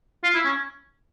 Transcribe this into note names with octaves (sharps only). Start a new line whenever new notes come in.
F4
E4
C#4